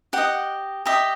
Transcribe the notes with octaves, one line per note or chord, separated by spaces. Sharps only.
G4 D#5 F#5
G4 D#5 E5